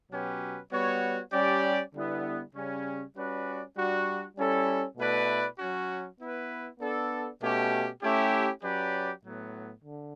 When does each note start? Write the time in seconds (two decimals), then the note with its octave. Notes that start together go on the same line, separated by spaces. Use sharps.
0.11 B2 F#3 C#4 G4 B4
0.71 G3 B3 F#4 C#5
1.32 G3 C#4 G4 D5
1.94 D3 G3 B3 E4
2.55 C#3 G3 C#4
3.15 G3 C#4 F#4 B4 D5
3.76 G3 D4 F#4
4.37 G3 C#4 E4 A4
4.97 B2 A3 E4 B4 D5
5.58 F#3 C#4 F#4
6.19 B3 E4 B4
6.80 B3 D4 A4 D5
7.41 B2 A3 C#4 G4
8.02 A3 C#4 E4 G4
8.63 F#3 C#4 G4 B4 D5
9.23 A2 F#3 B3
9.83 D3